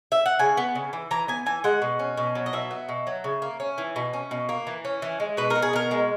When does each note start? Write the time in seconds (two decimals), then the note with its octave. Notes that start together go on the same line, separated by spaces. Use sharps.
0.12 E5
0.26 F#5
0.39 C#3 G#5
0.57 B3
0.75 C#3
0.93 E3
1.11 E3 A#5
1.28 B3 G#5
1.46 E3 G#5
1.64 G#3 F#5
1.82 B2
1.99 C#4
2.17 B2
2.35 F#3
2.46 D#5
2.53 B2 E5
2.71 B3
2.89 B2
3.07 F#3
3.24 C#3
3.42 A#3
3.60 C#4
3.78 E3
3.96 B2
4.13 C#4
4.31 B2
4.49 A#3
4.67 E3
4.85 C#4
5.02 E3
5.20 G#3
5.37 B2 B4
5.50 A#4
5.55 B3
5.62 G#4
5.73 B2 A#4
5.91 G#3